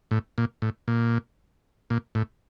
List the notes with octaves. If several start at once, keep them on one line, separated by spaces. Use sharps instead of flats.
A2
A#2
A2
A#2
A#2
A2